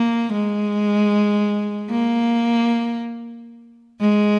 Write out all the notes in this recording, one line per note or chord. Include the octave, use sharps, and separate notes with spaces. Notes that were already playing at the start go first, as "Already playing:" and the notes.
Already playing: A#3
G#3
A#3
G#3